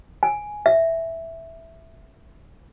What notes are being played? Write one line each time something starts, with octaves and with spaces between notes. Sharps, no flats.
G#5
E5